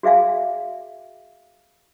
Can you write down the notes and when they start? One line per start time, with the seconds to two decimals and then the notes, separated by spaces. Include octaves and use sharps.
0.03 F#4 G#4 E5 F5 G#5